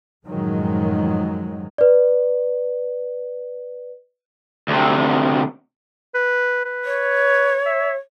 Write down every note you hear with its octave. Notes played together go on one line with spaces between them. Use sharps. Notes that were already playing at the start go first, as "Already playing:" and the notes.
F#2 A2 D#3 F3 F#3 G#3
B4 D5
D2 C3
B4
B4
C#5
E5